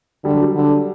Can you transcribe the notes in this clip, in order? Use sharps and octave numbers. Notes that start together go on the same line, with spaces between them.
D3 G3
F#3
G3
D3